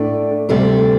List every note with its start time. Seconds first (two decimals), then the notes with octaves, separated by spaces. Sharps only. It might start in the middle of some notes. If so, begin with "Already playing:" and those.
Already playing: A2 A3 D4 A4 D5
0.49 D2 C3 G3 D4 A4